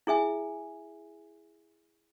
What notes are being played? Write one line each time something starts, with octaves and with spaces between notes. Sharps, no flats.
E4 G#4 E5 G#5